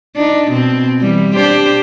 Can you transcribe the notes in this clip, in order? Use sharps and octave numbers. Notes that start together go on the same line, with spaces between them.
D4 D#4
B2 C4
E3 G3
D4 G4 C5